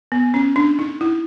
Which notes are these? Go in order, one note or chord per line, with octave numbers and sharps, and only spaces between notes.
B3
C#4
D4
D#4
E4